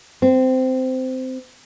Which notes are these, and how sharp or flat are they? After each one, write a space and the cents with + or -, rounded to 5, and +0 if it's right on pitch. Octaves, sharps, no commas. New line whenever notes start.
C4 -15